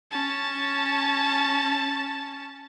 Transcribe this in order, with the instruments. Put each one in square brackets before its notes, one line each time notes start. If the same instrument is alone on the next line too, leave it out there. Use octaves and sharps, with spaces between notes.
[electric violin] C#4 A5